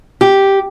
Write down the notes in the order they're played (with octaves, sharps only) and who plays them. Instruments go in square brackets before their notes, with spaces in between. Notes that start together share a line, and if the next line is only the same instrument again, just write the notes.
[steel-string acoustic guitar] G4